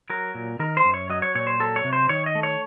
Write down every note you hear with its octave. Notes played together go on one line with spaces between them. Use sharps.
F#3 A#4
A#2
D#3 A#4
C5
F#2
C#5
F#3 D#5
C#5
A#2 C#5
C5
F#3 A4
C#5
C3
C5
D#3 C#5
D#5
A3
C#5